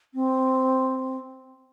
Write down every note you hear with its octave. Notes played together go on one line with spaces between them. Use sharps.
C4